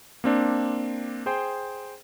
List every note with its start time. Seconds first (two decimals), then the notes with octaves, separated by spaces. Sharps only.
0.24 A#3 C4 D4
1.26 G#4 C5 G5